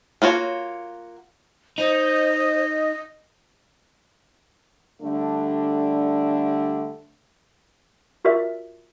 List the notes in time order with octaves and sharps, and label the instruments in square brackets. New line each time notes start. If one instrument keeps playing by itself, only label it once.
[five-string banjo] A#3 F4 F#4 C#5
[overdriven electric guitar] D#4 [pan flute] C5 [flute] D#5
[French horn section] D3 G3 A3 D4
[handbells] F4 F#4 A#4 D5 E5